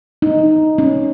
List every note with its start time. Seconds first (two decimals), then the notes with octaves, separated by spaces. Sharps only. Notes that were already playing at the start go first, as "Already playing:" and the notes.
0.22 D#4
0.78 C#4